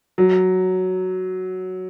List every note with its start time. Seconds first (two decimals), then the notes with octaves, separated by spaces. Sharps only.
0.18 F#3